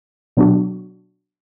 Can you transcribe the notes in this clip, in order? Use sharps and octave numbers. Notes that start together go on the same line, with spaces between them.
B2 F#3 B3 D4 F#4